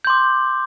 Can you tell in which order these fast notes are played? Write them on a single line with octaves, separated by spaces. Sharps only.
G6 C6 D6